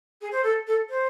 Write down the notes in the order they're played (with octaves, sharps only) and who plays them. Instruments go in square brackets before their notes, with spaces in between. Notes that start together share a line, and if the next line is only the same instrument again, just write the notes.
[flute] G#4
C5
A4
A4
C5